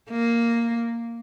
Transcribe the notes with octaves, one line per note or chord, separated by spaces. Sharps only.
A#3